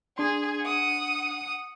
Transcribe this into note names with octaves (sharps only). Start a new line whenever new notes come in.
D4 G#4 C6
F#5 D#6